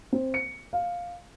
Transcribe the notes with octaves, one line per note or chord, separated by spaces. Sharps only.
C4
C#7
F5